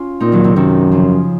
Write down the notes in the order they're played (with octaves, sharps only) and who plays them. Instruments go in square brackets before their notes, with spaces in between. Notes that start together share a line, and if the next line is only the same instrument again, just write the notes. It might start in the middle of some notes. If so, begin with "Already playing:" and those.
Already playing: [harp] C#4 F4
[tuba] A#2 [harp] C4 D#4
[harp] D#3 F#3
C3 D#3
[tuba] F#2 [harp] C3 D#3
[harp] C#3 F3